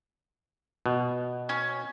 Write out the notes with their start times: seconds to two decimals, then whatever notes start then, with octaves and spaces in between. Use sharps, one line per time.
0.86 B2
1.49 C#4